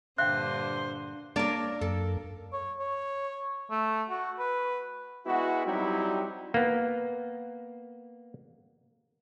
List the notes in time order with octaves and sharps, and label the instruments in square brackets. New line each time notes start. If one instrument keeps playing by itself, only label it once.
[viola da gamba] G2 A#2 D3 [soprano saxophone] C5 [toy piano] E5 F5 G5 [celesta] F#6
[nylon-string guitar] A#3 A#4 [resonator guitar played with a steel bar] D4 C#5 D5
[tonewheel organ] F#2 [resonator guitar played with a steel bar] A4
[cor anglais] C#5
C#5
A3
F#4
B4
[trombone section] G#3 B3 E4 F#4
F#3 G3 C4 D#4 E4 G4
[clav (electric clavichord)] A#3 B3